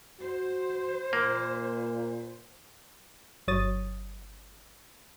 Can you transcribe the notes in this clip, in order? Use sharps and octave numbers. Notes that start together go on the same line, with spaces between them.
F#4 C5
A#2 A#3
G1 F#3 C#5 D#6 A6